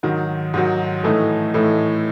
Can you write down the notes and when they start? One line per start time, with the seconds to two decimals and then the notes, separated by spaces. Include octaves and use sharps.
0.03 G#2 D#3 F#3
0.54 G#2 D#3 F#3
1.03 A2 E3 A3 D#4
1.54 A2 E3 A3 D#4